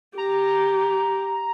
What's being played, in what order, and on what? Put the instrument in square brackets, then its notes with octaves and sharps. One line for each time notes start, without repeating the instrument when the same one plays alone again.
[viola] G4 [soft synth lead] A#5